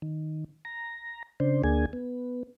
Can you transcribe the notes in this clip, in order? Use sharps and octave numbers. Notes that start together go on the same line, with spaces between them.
D#3
A#5
C#3 D4 C5
D2 A#3 D4 G#4 G#5
B3